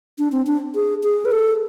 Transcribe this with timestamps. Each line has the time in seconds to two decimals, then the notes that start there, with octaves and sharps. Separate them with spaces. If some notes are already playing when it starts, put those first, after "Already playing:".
0.18 D4
0.32 C4
0.47 D4
0.75 G#4
1.04 G#4
1.25 B4
1.32 A4